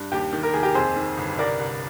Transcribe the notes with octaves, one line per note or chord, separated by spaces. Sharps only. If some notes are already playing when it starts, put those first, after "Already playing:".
Already playing: G2
D#2 G4
D#3
A#4
D#2 G#4
G4 A#4
F2 G#4 C5
D#3
G1
C2 A#4 D5
C2